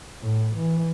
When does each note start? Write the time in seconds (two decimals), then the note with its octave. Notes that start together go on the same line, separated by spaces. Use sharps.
0.21 A2
0.56 E3